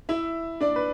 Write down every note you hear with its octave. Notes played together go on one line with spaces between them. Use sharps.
E4 E5
D4 D5
B4